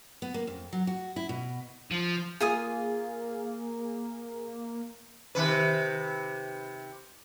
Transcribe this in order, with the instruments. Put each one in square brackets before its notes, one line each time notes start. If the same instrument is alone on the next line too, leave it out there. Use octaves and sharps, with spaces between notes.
[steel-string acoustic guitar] B3
A#3
F2
F#3
F#4
E4
B2
[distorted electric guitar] F3
[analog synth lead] A#3 [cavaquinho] F4 G#5 D#6 [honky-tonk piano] G#4
[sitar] C3 D#3 B4